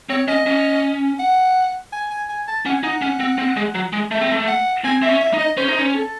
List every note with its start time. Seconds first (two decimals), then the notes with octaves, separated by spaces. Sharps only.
0.09 C4 C#5
0.28 C#4 D#5
0.46 C#4
1.19 F#5
1.92 G#5
2.10 G#5
2.29 G#5
2.47 A5
2.66 C#4 F#5
2.74 G#5
2.83 D#4 F#5
3.02 C#4
3.20 C4
3.38 C4
3.57 G#3
3.75 F#3
3.93 G#3
4.11 A3 E5
4.21 C4
4.32 A3
4.48 F#5
4.84 C4 G#5
5.02 C4 E5
5.09 C#4
5.21 E5
5.33 D#4
5.39 D#5
5.57 C#4 C5
5.68 D#4
5.78 C#4
5.94 A4